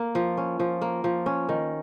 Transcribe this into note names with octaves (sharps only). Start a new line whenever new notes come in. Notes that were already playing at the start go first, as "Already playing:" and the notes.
Already playing: A#3
F3
C#4
F3
A#3
F3
C#4
D#3